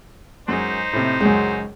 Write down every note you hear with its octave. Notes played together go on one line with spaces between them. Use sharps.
F#2 G#3 D#4 C5
A2 C3
C#2 F#2 G#3